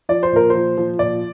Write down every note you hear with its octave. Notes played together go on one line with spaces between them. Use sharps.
F3 D5
C5
A#2 A#4
F3 C5
F3
A#2 D5